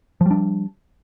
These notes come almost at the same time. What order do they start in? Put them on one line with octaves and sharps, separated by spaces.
F3 G3 D4